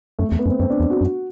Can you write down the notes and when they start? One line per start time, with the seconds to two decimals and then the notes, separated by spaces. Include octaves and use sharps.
0.19 F#2 A3
0.29 A3
0.32 E2
0.39 B3
0.46 F#2
0.50 C4
0.60 F#2 C4
0.70 D4
0.80 E2
0.90 F#4
1.01 F#2